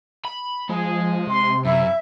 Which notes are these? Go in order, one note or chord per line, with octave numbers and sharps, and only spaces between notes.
B5
F3 G#3 G#4
C3 C6
F#2 E4 E5